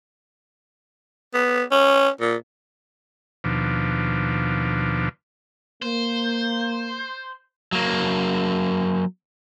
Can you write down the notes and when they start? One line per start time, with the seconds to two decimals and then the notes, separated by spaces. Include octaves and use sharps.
1.34 B3
1.71 C#4
2.21 A#2
3.44 D#2 B2 F3 D4
5.82 A#3 C5
7.72 F#3 A#3